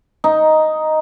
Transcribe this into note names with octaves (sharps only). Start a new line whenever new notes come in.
D#4